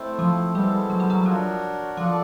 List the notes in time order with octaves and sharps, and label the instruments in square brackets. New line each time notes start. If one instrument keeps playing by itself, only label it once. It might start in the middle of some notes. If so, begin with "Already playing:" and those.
Already playing: [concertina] A3 C4 E4 A4 C5
[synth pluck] F3
[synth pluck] G3 [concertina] G#3 B3 E4 A4 C5
[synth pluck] F#3
G3
F#3
[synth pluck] F3 [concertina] D4 F#4 A#4 C#5 F#5
[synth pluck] F3 [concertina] F4 A4 D5 F#5